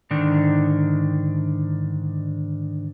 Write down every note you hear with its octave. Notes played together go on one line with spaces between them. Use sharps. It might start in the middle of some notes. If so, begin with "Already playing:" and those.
G#2 D3 D#3 D4